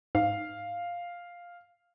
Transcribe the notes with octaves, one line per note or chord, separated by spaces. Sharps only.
G#2 F5